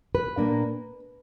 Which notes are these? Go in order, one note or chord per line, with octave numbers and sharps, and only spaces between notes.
B4
A#2 A#3 D4